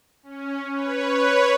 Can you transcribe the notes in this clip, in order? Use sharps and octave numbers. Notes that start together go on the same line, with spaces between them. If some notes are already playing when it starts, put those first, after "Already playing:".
C#4
B4 C#5